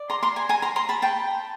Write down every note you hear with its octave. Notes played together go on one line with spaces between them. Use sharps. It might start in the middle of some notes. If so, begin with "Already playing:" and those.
Already playing: D5
A#5 C6
A#5 C6
G#5 A#5
G#5 A#5
A#5 C6
A#5 C6
A5 B5
G5 A5